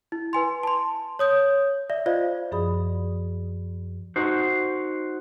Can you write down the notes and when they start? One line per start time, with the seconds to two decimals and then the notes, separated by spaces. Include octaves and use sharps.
0.12 E4
0.33 B4 G#5 C6
0.63 A5 C6
1.19 C#5 D#6 G6
1.90 D5 E5
2.06 F4 C5 D5 D#5 F5
2.52 F#2 F3 G#4 D5 B5 D#6
4.16 D#4 F#4 C5